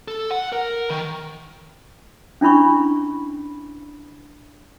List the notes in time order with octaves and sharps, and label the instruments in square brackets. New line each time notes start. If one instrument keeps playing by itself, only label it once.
[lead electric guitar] A4
F#5
A#4
D#3
[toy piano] C#4 D4 E4 B5 C#6